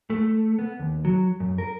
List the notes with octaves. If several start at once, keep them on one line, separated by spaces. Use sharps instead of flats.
A3
B3
D#2
F#3
F#2
A#4